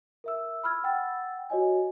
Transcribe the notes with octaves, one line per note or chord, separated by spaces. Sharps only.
A#4 E5 E6
B5 E6 F6 G#6
F#5 G5 E6 A6
F#4 C#5 D#5 G#5